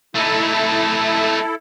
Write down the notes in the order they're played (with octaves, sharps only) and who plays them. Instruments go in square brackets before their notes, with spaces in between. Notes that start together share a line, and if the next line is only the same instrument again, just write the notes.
[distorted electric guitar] A3 D#4 [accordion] E4 A4